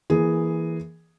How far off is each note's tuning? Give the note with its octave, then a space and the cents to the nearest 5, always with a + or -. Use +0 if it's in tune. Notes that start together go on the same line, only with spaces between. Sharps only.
E3 +0 A#3 +15 G#4 +0